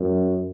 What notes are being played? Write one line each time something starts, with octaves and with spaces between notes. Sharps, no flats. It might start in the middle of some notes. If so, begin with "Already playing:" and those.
Already playing: F#2